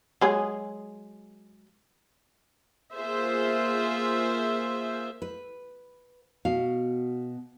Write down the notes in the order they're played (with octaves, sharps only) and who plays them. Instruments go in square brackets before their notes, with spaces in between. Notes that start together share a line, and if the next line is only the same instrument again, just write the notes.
[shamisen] F#3 G#3 G#4
[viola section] A#3 F4 G#4 C5 E5
[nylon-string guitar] B4
B2 F#4 F5